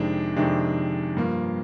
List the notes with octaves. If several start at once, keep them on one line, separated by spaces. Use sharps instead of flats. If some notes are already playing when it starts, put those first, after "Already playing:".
Already playing: F2 C3 D#3 G#3 D4
F2 C3 D#3 G#3 D4
G2 F3 A#3